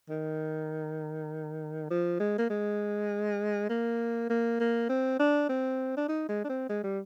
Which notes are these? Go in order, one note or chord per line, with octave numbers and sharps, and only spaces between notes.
D#3
F3
G#3
A#3
G#3
A#3
A#3
A#3
C4
D4
C4
D4
D#4
G#3
D4
C4
G#3
G3